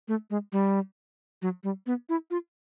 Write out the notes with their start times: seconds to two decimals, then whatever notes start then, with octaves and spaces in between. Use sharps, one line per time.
0.08 A3
0.30 G#3
0.52 G3
1.42 F#3
1.64 G3
1.86 B3
2.09 E4
2.31 F4